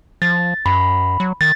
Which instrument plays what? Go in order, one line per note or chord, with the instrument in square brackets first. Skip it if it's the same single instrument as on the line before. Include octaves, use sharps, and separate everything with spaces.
[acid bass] F3 [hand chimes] A6
[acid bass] F#2 [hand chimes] B5
[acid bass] F#3
[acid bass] D#3 [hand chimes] A6